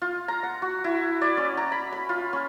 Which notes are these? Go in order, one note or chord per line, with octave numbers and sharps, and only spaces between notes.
F4
A#5
F#5
F#4
E4
D5
C#4
A#5
B5
B5
F4
C#4